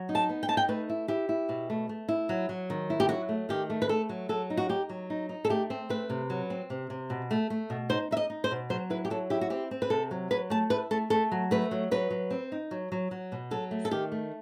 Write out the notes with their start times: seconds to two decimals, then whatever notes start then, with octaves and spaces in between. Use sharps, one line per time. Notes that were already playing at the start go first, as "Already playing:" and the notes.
Already playing: F#3
0.09 D#4
0.15 A5
0.29 B3
0.43 G5
0.48 D#4 A5
0.57 G5
0.69 A3 B4
0.89 E4
1.08 E4 G4
1.29 E4
1.49 B2
1.70 A3
1.89 A3
2.09 E4
2.29 F#3
2.49 F#3
2.70 D#3
2.90 E4
3.00 G4
3.09 F#3 F#4
3.29 A3
3.49 D#3 G4
3.70 A3
3.82 B4
3.89 A3 A4
4.09 F#3
4.29 F#3 A4
4.50 D#4
4.57 F#4
4.69 D#4 G4
4.89 F#3
5.10 D#4
5.29 D#4
5.45 A4
5.49 A3 G4
5.70 C4
5.89 A3 B4
6.10 C3
6.30 F#3
6.50 C4
6.70 C3
6.90 C3
7.10 B2
7.31 A3
7.50 A3
7.70 B2
7.90 D#4 C5
8.11 D#4 E5
8.17 D#5
8.30 D#4
8.44 C5
8.51 B2
8.70 F#3 C5
8.90 E4 B4
9.05 G4
9.10 F#3 A4
9.30 E4 G4
9.41 F#4
9.50 C4 G4
9.71 C4
9.82 B4
9.90 C3 A4
10.11 F#3
10.31 F#3 B4
10.50 A3 A5
10.70 E4 B4
10.91 A3 A4
11.10 A3 A4
11.32 F#3
11.51 A3 B4
11.71 F#3
11.91 F#3 B4
12.10 F#3
12.31 C4
12.52 D#4
12.71 F#3
12.92 F#3
13.11 F#3
13.32 B2
13.51 F#3 A4
13.71 A3
13.85 A4
13.91 D#3 G4
14.12 A3